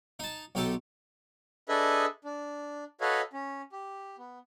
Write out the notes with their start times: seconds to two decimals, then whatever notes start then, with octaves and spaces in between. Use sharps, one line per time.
0.19 D#4 A5
0.55 B1 D#4 G4 A4
1.69 D4 G#4 A4 B4 D#5 E5
2.25 D4
3.01 F#4 A4 B4 C#5 D#5 F5
3.33 C#4
3.72 G4
4.18 B3